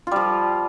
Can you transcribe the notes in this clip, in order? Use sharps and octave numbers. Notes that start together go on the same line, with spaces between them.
F3 G3 F4